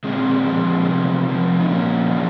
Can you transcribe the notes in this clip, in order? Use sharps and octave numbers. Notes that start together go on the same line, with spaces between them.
A#2 G#3 C4
F3
C3
F3
D#4
A#2 A#3 C#4
F3